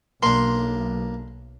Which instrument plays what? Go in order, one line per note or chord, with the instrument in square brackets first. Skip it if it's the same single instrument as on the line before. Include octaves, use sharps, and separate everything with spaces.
[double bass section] B1 [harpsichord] A#3 D4 [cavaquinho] C6